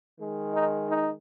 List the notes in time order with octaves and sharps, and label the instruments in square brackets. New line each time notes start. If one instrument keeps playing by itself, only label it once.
[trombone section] D#3 G#3
D#4
D#4